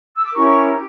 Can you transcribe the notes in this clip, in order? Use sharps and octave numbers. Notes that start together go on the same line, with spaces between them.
E6
D6
C#4 E4 G4 A#4 C#6
G4